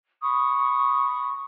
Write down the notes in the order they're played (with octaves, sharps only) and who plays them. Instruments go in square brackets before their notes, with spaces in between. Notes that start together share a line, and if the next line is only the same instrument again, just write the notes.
[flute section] B5 C#6 D#6